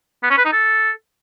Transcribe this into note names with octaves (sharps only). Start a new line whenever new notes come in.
B3
C#4
B4
D#4
A4